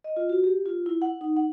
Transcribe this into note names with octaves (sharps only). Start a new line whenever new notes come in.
D#5
F4
F#4
G4
F4
E4
F#5
D#4
F#5